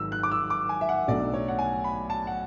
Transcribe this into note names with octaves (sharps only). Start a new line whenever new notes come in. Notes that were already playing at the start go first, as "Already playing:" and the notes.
Already playing: G#1 G#2 F#3 E6
F#6
D6
E6
D6
G#5
E5
F#5
B1 B2 F#3 A3 D4 D5
C#5
F#5
G#5
B5
A5
F#5